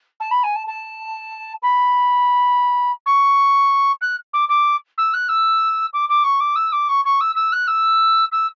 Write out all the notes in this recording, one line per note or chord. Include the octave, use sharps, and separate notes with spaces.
A5
B5
G#5
A5
A5
B5
C#6
F#6
D6
D6
E6
F#6
E6
D6
D6
C#6
D6
E6
D6
C#6
C#6
E6
E6
F#6
E6
E6